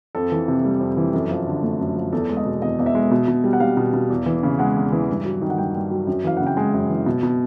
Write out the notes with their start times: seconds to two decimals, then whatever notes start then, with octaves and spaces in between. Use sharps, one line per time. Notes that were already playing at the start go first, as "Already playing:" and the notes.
0.15 F2 A4
0.32 E3
0.48 C3
0.65 G3
0.81 F2
0.97 E3
1.13 F#2 A4
1.30 F3
1.47 D3
1.63 A3
1.80 F#2
1.96 F3
2.13 E2 A4
2.29 G#3
2.37 D#5
2.46 B2
2.62 E2 D#5
2.79 E2 D#5
2.86 E5
2.95 G#3
3.11 B2
3.28 B2
3.44 G3
3.53 F#5
3.60 G3 F5
3.77 B2
3.93 B2
4.10 E2
4.26 E3
4.43 C#3
4.59 G#3 F#5
4.76 E2
4.92 E3
5.09 G2
5.25 F#3
5.41 D#3
5.50 F#5
5.58 G2 G5
5.75 G2
5.91 F#3
6.07 F#2
6.24 E3 F5
6.37 C#3 F#5
6.47 G5
6.57 G#3 G#5
6.74 F#2
6.90 E3
7.06 B2
7.23 B2